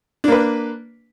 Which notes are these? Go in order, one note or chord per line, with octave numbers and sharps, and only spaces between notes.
A#3 D4 B4